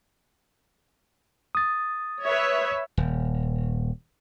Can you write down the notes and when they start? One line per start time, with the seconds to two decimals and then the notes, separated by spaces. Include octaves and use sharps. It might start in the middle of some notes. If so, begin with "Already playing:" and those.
1.55 D#6 A6
2.23 B4 C#5 E5
2.97 D#1